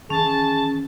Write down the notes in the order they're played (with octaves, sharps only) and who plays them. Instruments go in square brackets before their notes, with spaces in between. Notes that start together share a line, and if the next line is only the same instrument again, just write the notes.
[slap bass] D#3 E3 [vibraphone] C#4 [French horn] G#4 [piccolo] A5